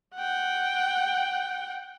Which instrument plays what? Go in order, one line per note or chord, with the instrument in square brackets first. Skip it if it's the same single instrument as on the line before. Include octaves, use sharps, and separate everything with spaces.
[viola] F#5 G5